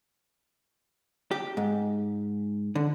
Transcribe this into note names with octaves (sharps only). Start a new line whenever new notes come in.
G4
G#2
D3